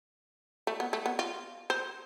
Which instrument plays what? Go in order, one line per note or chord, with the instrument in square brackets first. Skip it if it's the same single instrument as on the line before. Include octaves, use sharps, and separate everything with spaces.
[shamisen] A3
B3
A3
B3
F4
C5